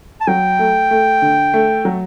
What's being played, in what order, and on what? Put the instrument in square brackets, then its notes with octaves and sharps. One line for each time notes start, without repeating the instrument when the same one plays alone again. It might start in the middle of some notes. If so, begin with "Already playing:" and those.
[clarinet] A5
[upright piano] F#3 [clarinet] G5
[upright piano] A3
A3
D3
A3
F#3